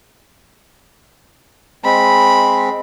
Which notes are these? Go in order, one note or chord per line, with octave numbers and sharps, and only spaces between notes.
G#3 C4 B5